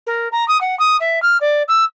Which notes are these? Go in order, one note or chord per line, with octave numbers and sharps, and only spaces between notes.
A#4
A#5
D#6
F#5
D#6
E5
F6
D5
E6